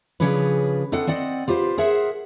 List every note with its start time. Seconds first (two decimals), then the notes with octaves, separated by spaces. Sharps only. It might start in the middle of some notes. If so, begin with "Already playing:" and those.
0.20 C#3 F3 C#4 D4 G#4 B4
0.92 C4 D4 A4 D#5 F#5
1.07 C4 D5 D#5 F#5
1.48 F4 G4 B4 C5
1.78 G#4 A#4 C5 E5 F#5